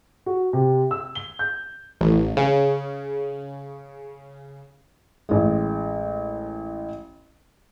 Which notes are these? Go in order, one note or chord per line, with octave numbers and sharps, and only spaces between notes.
F#4
C3
E6
G7
G6
A1
C#3
A1 G#3